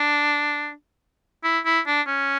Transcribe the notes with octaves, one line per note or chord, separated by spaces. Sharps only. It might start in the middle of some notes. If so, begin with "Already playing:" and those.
Already playing: D4
E4
E4
D4
C#4